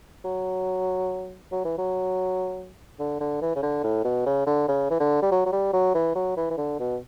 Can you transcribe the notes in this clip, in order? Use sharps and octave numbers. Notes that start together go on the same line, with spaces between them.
F#3
F#3
E3
F#3
D3
D3
E3
C#3
D3
A2
B2
C#3
D3
C#3
E3
D3
G3
F#3
F#3
G3
F#3
E3
F#3
E3
E3
D3
B2